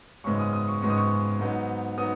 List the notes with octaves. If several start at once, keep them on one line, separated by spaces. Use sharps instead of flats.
G#1 F#2 C#3 G#3 B3 C#6
D#6
D#6
C#6
G#1 F#2 C#3 G#3 B3 C#6
D#6
C#6
G#2 F#3 B3 D#4
F#3 B3 D#4 D#6